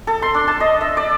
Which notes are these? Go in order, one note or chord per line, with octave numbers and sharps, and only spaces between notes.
A4
C6
D4
A5
D#5
E5
D5